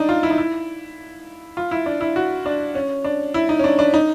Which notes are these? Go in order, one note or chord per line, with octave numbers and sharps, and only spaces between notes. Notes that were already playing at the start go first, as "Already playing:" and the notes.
Already playing: D4 D#4
F4
E4
D#4
E4
F4
E4
D4
E4
F#4
D4
C#4
D4
E4
D#4
C#4
D4
D4
D#4